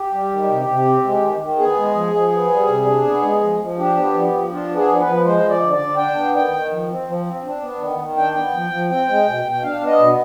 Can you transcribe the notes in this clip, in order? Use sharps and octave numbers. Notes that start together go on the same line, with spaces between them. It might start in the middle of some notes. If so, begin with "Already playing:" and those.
Already playing: G4
G3
D#3
C3
C3
C4
G#3
D#3
D#3
B3 G#4
G#3
F3
F3
B3
G3
C3
D4
B3
G#3
F3
F3
D4 G4
B3
F3
F3
D4 F4
B3
G#4
F3
B4
F3
G#3 C5
F3
D5
D3
D5
D3
D4 G5
B3
D#3 G5
D#3
F3
C4
F3
C4
D4
B3
D#3
D#3
D4 G5
B3
F3
F3
C4 G5
G#3
B2
B2
G5
D4 F5
B3
D#5
B2